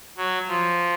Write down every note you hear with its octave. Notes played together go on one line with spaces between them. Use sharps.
F#3
F3